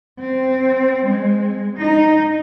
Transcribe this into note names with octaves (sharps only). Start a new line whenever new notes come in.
C4
G#3
D#4